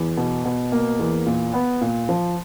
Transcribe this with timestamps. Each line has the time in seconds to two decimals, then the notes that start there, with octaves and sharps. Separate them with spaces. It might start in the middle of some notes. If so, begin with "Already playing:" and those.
Already playing: E2
0.17 B2
0.45 B2
0.72 A#3
0.99 E2
1.26 A#2
1.53 B3
1.81 A#2
2.09 F3